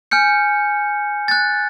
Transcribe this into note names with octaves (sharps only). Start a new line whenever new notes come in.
G#5 F6 G6 C#7
F#6 A6